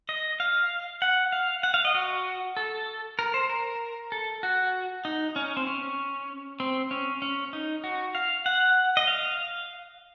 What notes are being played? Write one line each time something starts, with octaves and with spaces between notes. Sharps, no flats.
D#5
F5
F#5
F5
F#5
F5
D#5
F#4
A4
A#4
C5
A#4
A4
F#4
D#4
C#4
C4
C#4
C4
C#4
C#4
D#4
F#4
F5
F#5
D#5
F5